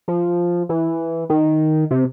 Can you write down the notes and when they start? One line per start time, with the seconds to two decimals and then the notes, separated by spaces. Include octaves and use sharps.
0.08 F3
0.69 E3
1.29 D#3
1.91 C3